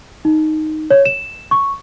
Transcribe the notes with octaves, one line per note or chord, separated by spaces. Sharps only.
D#4
C#5
E7
C#6